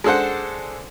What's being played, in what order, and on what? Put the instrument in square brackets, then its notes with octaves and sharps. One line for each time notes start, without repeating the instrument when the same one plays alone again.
[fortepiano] G#3 D4 A4 C5 F#5